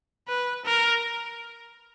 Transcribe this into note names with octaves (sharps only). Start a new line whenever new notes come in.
B4
A#4